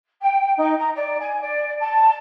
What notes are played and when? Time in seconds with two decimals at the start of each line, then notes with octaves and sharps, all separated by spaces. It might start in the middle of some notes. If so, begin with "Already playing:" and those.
0.21 G5
0.57 D#4
0.79 A#5
0.95 D5
1.19 G#5
1.41 D5
1.80 A5